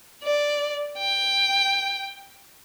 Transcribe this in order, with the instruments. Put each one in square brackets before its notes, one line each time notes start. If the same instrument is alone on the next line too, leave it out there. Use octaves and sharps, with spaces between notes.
[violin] D5
G5